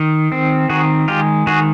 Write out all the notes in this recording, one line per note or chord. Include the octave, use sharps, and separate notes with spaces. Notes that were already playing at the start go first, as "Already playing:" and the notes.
Already playing: D#3
C4
D#3 F#4 G#4
G#3 F4 G4
D#3 F#4 G#4